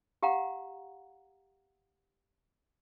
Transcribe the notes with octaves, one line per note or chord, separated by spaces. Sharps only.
G4 F5 F#5 A#5